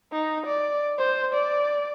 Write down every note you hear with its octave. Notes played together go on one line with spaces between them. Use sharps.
D#4
D5
C5
D5